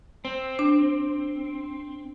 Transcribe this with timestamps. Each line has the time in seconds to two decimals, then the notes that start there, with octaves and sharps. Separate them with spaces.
0.25 C4
0.59 D4